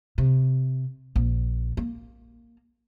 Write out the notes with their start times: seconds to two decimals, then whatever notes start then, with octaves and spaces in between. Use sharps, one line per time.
0.18 C3
1.16 A#1
1.77 A#3